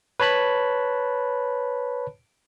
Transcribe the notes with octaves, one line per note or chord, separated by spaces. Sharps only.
B4 C#5 A5 B5 F#6